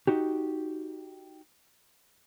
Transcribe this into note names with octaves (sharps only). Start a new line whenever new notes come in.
D#4 F#4 G4